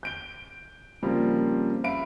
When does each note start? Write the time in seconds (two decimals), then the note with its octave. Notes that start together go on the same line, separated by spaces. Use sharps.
0.03 G6 D7 G7
1.02 C#3 F3 G3 A#3 C4
1.84 E5 F5 B5 D7